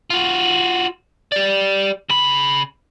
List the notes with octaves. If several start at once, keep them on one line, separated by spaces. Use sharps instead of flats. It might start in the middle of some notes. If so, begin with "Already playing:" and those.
F4 F#4
G4 D5
C#3 B5